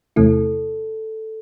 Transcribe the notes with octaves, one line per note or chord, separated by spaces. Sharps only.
E2 C3 A3 E4 A4